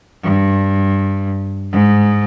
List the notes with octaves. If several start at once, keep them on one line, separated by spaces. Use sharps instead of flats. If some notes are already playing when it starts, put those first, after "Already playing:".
G2
G#2